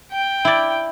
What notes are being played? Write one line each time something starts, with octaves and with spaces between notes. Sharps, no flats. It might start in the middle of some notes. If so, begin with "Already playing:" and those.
G5
E4 D5